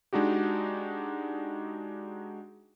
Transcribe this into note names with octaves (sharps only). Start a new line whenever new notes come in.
G#3 D4 D#4 F#4 G4